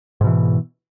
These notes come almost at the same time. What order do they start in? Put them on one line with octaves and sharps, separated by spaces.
G#2 B2 E3